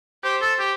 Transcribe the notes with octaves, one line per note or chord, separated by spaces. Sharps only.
G4 C5
A4
G4